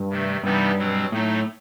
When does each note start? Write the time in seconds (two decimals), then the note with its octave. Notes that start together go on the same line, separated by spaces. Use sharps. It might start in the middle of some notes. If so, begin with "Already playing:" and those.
Already playing: G2
0.10 C3 D#3 A3
0.43 G2 C3 E3 G3 B3 D#4
0.78 B2 F#3 C4
1.12 A2 F#3 A3 D#4